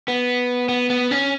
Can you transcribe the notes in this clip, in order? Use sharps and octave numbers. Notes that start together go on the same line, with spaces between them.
B3
B3
B3
C#4